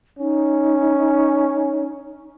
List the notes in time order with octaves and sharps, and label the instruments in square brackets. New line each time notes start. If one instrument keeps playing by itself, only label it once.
[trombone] C#4 [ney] D#4